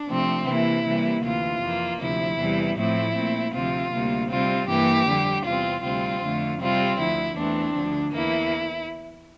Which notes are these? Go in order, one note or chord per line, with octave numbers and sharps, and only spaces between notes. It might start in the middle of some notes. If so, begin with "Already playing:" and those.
Already playing: D4
C3 F3 A3 C4
C3 E3 A#3 E4
C3 E3 G3 A#3
D2 C3 E3 F4
F2 E3 A#3
D2 C3 F3 E4
E2 C3 E3 G3
A2 F3 A3 C4 E4
A#2 A3 C4
D2 C3 F3 C4 F4
D2 C3 G3 A#3
C3 G3 C4 F4
G2 E3 A#3 G4
F2 D3 G3
E2 C3 G3 C4 F4
D2 C3 G3 C4 F4
F2 D3 A3
C3 G3 C4 F4
D2 D3 F3 E4
E2 E3 A3 C4 D4
D2 D3 F3
E2 E3 A#3 E4